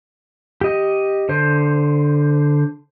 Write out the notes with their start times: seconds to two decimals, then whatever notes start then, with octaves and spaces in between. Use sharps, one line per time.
0.61 G4 D#5
1.29 D3 C5